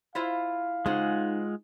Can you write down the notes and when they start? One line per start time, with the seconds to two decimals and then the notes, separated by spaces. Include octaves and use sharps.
0.15 E4 F4 C5 F5
0.86 C#3 G#3 D#4 F4 G#4 C5 F#5